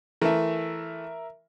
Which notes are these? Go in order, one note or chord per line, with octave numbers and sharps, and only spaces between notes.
E3 A3 A#4 E5